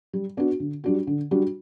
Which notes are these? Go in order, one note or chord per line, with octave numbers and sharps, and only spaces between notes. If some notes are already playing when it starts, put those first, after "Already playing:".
G3
B3 D4 F#4
D3
G3 D4 F#4
D3
G3 D4 F#4